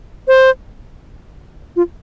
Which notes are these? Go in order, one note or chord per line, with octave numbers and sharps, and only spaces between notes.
C5
F4